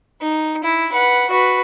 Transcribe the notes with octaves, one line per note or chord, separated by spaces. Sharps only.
D#4
E4
B4 F#5
F#4 B4